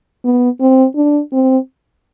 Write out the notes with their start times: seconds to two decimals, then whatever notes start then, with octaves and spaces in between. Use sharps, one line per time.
0.24 B3
0.60 C4
0.96 D4
1.33 C4